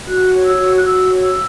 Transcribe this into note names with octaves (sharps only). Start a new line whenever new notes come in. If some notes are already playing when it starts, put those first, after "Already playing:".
F#4 F#6
C#5
E6
F#4
F#6
F#4 E6
C#5
E6